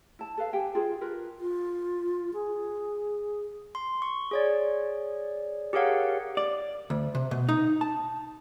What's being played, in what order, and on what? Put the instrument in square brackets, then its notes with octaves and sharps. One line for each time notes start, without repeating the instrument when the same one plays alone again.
[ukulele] E4 A5
A4 B4 F5
G4 G5 G#5
F4 G#4 C5
F4 A#4 B4
[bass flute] F4
G#4
[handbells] C6
C#6
G#4 C#5 D5
G4 G#4 A#4 C#5 F5 F#5
[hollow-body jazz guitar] D5
D2
C3
B2
D#4
A5